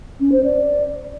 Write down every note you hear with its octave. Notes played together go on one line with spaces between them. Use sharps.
C#4
C5
D5